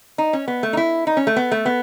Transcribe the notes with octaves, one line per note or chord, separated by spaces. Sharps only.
D#4
C#4
B3
A3
D#4
E4
D#4
C#4
A3
B3
A3
B3